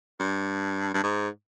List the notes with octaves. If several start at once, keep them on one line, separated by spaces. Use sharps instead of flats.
G2
G2
G#2